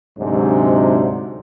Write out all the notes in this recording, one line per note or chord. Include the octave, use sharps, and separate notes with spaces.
D2 G#2 C3 F#3 D4